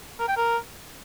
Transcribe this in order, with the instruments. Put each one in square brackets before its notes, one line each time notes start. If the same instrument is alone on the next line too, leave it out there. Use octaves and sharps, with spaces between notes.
[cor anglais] A#4
G5
A#4